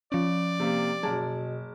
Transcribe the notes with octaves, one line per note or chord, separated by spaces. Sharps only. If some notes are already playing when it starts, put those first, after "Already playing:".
F3 C#4 D5
C3 A#3 G4
F#1 B2 G#4 A5